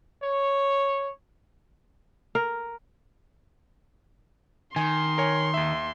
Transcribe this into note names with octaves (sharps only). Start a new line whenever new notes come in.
C#5
A#4
D#3 G#5 C6
A#4 C#5 G#5
D#2 E5